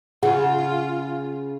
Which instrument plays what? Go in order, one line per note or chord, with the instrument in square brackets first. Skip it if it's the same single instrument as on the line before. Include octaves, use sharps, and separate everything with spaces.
[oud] C#3 [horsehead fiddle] F4 [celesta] G#4 [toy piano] F#5